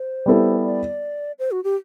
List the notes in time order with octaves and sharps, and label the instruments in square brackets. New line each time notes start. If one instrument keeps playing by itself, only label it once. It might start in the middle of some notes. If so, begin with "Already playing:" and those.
Already playing: [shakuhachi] C5
[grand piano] G3 B3 E4 A4
[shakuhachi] D5
C5
F#4
G4